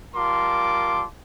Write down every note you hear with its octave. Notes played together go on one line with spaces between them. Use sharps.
G3 F4 A#4 A5 C6 D6